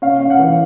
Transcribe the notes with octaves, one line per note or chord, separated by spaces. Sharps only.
C#4 F5
C#4
F#5
E3